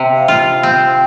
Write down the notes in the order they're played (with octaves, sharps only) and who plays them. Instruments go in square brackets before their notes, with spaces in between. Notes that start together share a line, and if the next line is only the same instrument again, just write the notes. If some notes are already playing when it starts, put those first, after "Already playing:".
Already playing: [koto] C3
[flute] F5
[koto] F4
[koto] C4 [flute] G5